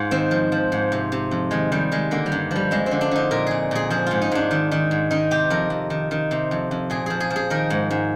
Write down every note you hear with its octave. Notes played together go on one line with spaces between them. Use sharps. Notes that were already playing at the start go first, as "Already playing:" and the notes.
Already playing: G#2 F4
D#3 C4
F3
F3
G#2
C3
C3
F2
D#3 G#3
D#3 G3
D#3 G#3
D3 A#3
G3
G2
F3 G3
F2 G#3
C4
D3
D4
D3 D#4
A#2 A#4
A#2 G#4
A#2 G#4
F3 G#4
G#2 F4
D#4
G#2 D4
D#3
D#3
G#2
D#3 D#4
C3 G4
F2 A#4
F2
D#3
D#3
C3
F2
F2
A#2 G#4
F3 G#4
G#4
F3
G#4
D#3 A#4
G#2
G#2